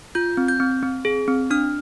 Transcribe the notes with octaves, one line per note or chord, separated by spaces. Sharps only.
F4 G6
C4
G6
C4
C4
G#4
C4
D4 F6